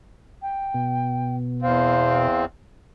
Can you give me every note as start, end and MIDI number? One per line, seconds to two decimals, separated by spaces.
0.42 1.36 79
0.74 2.28 47
1.62 2.45 40
1.62 2.45 60
1.62 2.42 77